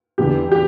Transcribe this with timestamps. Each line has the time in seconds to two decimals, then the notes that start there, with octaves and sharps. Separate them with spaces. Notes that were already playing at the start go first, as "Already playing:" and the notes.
0.18 F1 E2 D3 G4
0.52 G4